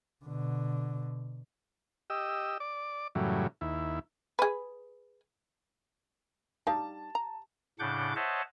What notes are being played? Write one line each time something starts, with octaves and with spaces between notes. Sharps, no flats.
B2 D3
G4 D#5 E6
D5 D6
F#2 A2 C#3 E3 F#3 G3
D#2 E4
G#4 B4
G3 D#4 F5 A5
A#5
A2 C#3 D4 F#5 D6 G6
C5 C#5 D#5 E5 F#5 A5